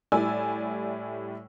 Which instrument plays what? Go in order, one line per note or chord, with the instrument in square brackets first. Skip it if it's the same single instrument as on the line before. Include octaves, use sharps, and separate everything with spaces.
[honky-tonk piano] A2 G3 E4 D5 G#5 E6